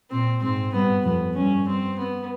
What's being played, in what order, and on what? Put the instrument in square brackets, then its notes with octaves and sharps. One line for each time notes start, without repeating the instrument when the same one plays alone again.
[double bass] A#2 [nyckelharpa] C4
[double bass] G#2 [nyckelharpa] C4
[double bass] G2 [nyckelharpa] B3
[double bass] F2 [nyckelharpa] B3
[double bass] G2 [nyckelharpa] C#4
[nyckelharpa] C4
B3